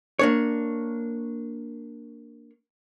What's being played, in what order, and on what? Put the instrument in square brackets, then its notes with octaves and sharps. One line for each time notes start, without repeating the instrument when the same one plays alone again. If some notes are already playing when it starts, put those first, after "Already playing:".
[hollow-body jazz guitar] A#3 D4 C#5